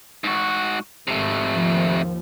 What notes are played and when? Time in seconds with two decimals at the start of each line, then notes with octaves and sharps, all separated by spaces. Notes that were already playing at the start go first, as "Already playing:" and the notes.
0.24 G#2 F#4
1.07 G#1 C3 A3
1.51 D#2 F3